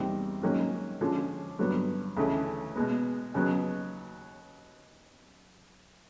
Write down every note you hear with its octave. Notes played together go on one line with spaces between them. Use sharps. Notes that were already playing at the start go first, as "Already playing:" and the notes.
Already playing: E2 C3 D#3 G3 C4
G#2 D#3 F#3 A#3 C#4
D3 F3 G#3 C#4 F4
G2 D3 F#3 B3
D2 C#3 E3 A3 C#4
B2 G#3 B3
D#2 C#3 F#3 B3